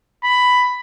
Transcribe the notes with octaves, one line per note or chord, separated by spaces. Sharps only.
B5